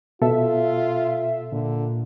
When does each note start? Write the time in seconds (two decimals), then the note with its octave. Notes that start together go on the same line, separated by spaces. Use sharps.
0.22 B2 F4 A4 E5
1.52 A#2 D3